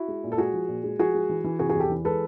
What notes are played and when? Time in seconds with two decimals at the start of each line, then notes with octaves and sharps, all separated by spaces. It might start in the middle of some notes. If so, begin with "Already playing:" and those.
Already playing: E4 F#4
0.08 G#3
0.24 A#2
0.32 A4
0.38 G#3 F#4 G#4
0.54 F3
0.69 A#2
0.84 G#3
0.99 F3 F#4 G#4
1.15 G#3
1.29 E3
1.44 E3
1.59 C3 F#4 G#4
1.69 F#4 G#4
1.75 E2 G4 A4
1.90 E3
2.05 G#3 A4 B4